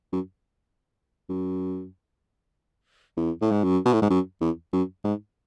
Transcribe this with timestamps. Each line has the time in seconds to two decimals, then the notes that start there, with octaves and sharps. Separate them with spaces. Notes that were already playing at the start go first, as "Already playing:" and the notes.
0.13 F#2
1.29 F#2
3.17 E2
3.41 A2
3.51 G#2
3.63 F#2
3.85 B2
3.93 A2
4.02 G#2
4.10 F#2
4.41 E2
4.73 F#2
5.04 G#2